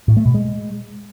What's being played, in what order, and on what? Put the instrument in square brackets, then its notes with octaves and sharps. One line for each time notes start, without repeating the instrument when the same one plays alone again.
[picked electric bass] A2
A3
B2
G#3